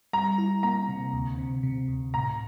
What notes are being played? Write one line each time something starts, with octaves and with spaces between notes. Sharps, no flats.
G3 A#5
E4
A#3 A#5
C3
D2
C3
C3
D2
A2 A#5